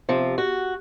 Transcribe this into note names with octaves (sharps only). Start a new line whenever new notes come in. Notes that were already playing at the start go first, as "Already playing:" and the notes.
C3 F3
F#4